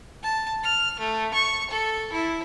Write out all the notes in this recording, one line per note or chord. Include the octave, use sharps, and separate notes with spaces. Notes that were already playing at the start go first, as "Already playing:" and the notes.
A5
F6
A3
C#6
A4
E4